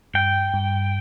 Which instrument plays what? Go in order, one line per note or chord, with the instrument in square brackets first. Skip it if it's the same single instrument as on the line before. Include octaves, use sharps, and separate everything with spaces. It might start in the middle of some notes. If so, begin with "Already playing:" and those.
[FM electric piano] G2 [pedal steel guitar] G5
[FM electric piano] G2